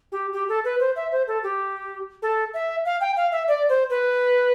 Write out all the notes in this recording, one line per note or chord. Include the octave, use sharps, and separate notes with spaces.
G4
G4
A4
B4
C5
E5
C5
A4
G4
A4
E5
F5
G5
F5
E5
D5
C5
B4